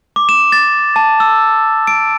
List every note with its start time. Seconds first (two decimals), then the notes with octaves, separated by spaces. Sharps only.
0.16 D6
0.29 E7
0.52 A6
0.96 A5
1.20 E6
1.87 D7